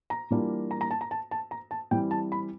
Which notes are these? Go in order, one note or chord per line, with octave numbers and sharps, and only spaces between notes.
A#5
E3 G3 A#3 D4 F4
A#5
A#5
A5
A#5
A5
A5
A#5
A5
E3 G3 C4 G5
A5
B5